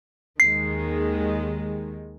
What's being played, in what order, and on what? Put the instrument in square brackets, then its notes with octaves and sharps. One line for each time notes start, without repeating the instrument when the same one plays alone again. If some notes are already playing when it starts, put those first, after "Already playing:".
[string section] D#2 D#3 G#3 [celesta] C7